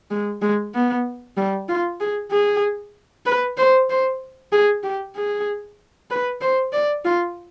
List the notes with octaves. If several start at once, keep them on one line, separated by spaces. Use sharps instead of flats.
G#3
G#3
B3
G3
F4
G#4
G#4
B4
C5
C5
G#4
G4
G#4
B4
C5
D5
F4